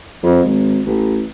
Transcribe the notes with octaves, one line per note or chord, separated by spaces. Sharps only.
F2
G#1
A1